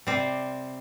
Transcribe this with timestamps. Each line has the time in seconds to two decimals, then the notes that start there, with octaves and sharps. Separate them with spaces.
0.07 C3 G3 C4